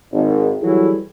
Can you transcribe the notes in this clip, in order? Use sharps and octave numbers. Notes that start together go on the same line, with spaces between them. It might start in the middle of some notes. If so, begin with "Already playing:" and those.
G#1
E3 F#3 G3 E4 G#4 A4